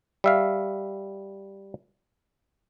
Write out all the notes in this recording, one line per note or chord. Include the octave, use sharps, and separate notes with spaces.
G3 E5 F5